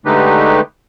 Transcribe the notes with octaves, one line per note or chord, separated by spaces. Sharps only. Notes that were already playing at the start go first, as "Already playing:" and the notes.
D3 G#3 A3 D#4 G4 B4